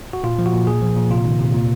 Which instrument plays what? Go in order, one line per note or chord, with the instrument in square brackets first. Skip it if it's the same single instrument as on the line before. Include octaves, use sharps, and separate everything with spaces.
[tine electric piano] F#4
A#2 F4
F3
F#4
A#2
A#2 G#4
F3
A#2
C3 F4
D#3
C3
A#2